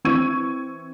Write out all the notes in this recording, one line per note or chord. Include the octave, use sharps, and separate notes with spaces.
E3 C4 C#6 E6 G#6 D#7